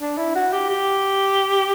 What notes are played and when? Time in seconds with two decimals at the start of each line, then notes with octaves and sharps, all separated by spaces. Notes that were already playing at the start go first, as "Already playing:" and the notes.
0.01 D4
0.18 E4
0.35 F#4
0.53 G4
0.70 G4